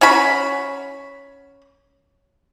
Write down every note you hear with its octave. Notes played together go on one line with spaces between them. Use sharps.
C#4 F#4 B5